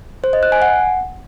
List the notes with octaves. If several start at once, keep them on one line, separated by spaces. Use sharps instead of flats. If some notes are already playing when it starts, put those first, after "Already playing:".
C5
D#5
F#6
G#5
F#5